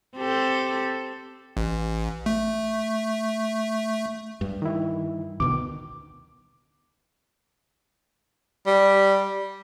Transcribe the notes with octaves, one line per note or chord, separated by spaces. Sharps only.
C4 G4 A4
A1
A3
G2
D#3 E4
D2 B2 D#3 D6
G3